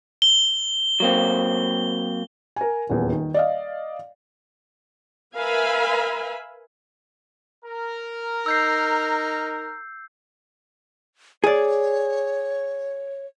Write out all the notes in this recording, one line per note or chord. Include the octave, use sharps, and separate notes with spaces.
G7
F#3 A#3 C4
A#4 G#5
D#1 E2
D#3
D5 D#5 F5
A#4 B4 E5 F5 G#5 B5
A#4
D#4 E6 G6 C7
G#4 C#5 D5